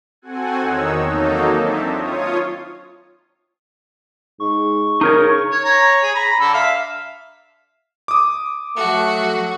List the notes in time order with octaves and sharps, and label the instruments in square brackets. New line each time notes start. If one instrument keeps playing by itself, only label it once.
[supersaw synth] C4 F#4 A4 F#5 G#5
E2 D#3 D#4 C#5 E6
F#3 A#3 D#4 A4
C4 D4 D#4 E5 A5
F4 C#5 D#6
[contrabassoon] G#2 [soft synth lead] C#6
[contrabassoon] C#3 [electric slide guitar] D#4 A#4 C#5
[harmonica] C#5
C#5 A#5
G#4
A#5 B5
D3 A4 E6
E5 F5
[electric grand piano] D6 D#6
[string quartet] F#3 F#4 [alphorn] A3